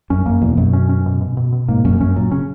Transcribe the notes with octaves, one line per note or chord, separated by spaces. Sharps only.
F#2 C#4
F#2 A#3
E2 B2
F#2 B2
C#4
C#4
B2
B2
B2
B2
G#2 A#3
F#2 C#4
F#2 C#4
A#2 F#3
C#3 C#4